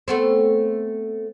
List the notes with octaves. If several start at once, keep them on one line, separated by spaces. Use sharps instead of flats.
A3 B3 C4